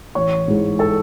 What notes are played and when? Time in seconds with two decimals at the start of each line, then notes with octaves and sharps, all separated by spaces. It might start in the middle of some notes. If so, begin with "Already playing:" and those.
0.15 A1 C#5 C#6
0.48 G#2 E3 G#3
0.79 A4 A5